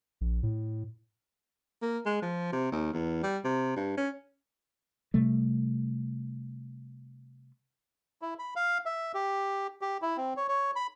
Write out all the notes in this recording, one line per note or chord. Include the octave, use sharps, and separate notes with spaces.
A#1
A2
A#3
G#3
F3
C3
D#2
E2
G3
C3
G2
C#4
C3 G3 A3
E4
B5
F5
E5
G4
G4
E4
C4
C#5
C#5
B5